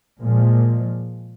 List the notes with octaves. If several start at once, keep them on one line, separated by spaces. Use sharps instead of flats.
A#2 F3 G#3